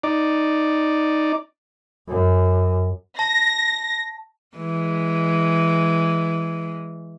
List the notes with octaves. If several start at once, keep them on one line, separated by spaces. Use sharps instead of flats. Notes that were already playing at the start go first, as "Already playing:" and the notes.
D#4 D5
F#2
A5 A#6
E3 G#3